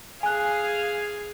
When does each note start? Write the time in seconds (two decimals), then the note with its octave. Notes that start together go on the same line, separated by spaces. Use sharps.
0.23 G#4 F5 G#5 F#6